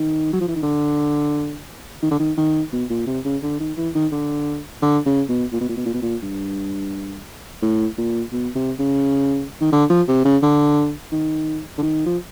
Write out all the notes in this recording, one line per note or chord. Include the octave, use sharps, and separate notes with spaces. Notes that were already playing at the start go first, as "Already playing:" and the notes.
Already playing: D#3
F#3
F3
E3
D#3
D3
D#3
D3
D#3
D#3
B2
A#2
C3
C#3
D3
D#3
E3
D#3
D3
D3
C#3
B2
A#2
B2
A#2
B2
A#2
B2
A#2
G2
A2
A#2
B2
C3
C#3
D#3
D3
F3
C3
C#3
D3
D#3
D3
D#3
F3